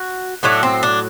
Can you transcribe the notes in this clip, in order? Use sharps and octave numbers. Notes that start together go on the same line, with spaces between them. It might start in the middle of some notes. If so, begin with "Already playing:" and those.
Already playing: F#4
A2 F#3 A3 D4
C4
D4